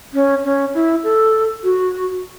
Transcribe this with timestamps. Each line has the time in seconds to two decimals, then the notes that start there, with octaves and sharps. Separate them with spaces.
0.13 C#4
0.44 C#4
0.74 E4
1.03 A4
1.63 F#4